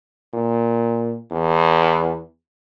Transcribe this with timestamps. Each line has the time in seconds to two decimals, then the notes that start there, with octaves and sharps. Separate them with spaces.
0.34 A#2
1.32 E2